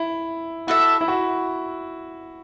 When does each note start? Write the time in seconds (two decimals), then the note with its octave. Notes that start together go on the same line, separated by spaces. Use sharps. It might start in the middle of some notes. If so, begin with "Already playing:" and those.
Already playing: E4
0.67 E4 F#4 A4 E5
1.01 E4
1.08 F#4